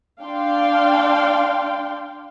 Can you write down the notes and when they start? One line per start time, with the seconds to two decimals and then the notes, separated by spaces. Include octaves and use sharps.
0.21 D4 F5 G5 C6